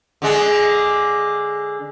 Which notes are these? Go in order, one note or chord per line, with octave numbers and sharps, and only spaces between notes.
D3 G#3